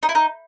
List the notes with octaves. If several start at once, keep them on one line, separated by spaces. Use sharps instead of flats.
D#4
E4
D#4